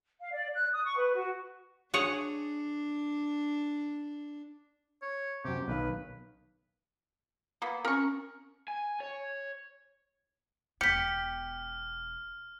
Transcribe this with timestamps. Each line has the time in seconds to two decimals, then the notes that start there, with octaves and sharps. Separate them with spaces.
0.20 F5
0.33 D5
0.55 F#6
0.72 D#6
0.84 C#6
0.97 B4
1.14 F#4
1.94 D4 G#4 C#5 F#5
5.02 C#5
5.45 F#2 C3 G4
5.68 B1 D#3 B4 F5
7.62 A#3 B3
7.85 C4 C#4 A#4 C#6
8.68 G#5
9.00 C#5
10.81 E1 B3 G4 F6 B6 C#7